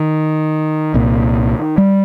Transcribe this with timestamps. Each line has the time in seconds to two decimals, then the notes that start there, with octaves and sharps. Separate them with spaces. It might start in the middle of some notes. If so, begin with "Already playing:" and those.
Already playing: D#3
0.94 C2 A#2
1.78 G3